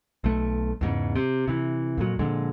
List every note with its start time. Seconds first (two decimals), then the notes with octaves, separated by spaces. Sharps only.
0.24 B1 A3
0.81 E2 G#2 C#3
1.15 C3
1.48 C3 E3
1.97 F2 A#2 F#3
2.19 F2 A#2 D3 G#3